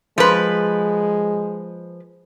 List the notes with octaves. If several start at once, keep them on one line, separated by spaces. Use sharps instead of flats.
F3 G#3 B4